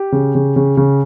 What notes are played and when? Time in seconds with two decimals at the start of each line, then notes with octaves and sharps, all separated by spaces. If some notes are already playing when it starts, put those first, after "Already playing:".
Already playing: G4
0.12 C#3
0.35 C#3
0.56 C#3
0.77 C#3